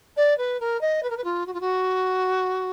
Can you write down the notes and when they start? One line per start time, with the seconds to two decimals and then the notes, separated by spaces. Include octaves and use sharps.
0.16 D5
0.37 B4
0.60 A#4
0.81 D#5
1.02 B4
1.10 A#4
1.17 B4
1.24 F4
1.46 F#4
1.53 F4
1.60 F#4